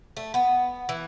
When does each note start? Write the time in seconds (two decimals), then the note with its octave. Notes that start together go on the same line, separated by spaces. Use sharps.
0.17 A3
0.34 B3
0.89 E3